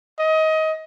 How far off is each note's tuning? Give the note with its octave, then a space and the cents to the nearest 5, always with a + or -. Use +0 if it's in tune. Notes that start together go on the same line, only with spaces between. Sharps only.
D#5 +25